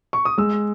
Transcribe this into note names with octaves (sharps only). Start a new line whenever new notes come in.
C#6
D#6
G#3 E6